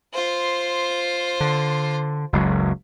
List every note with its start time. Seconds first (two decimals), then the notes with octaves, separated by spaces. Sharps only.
0.14 F4 C5
1.40 D3
2.33 F#1 C#2 F#3